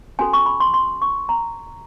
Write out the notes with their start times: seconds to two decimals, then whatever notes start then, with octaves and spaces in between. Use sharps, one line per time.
0.19 C#4 F#4 A4 G#5
0.33 C#6
0.46 B5
0.60 C6
0.74 C6
1.02 C#6
1.29 A#5